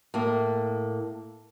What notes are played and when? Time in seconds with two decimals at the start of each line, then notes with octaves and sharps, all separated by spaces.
0.14 A2 A#3